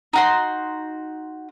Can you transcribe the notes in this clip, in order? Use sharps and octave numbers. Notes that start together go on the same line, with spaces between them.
D#4 F#4 C6